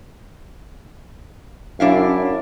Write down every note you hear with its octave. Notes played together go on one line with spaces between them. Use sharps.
F#2 D4 E4 F5